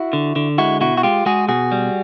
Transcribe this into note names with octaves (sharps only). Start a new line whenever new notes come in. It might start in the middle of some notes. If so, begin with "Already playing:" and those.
Already playing: E4 F#4
D3
D3
G#3 E4 F#4
B2 E4 F#4
F#4
G#3 F4 G4
G#3 F#4 G#4
B2 F#4 G#4
G3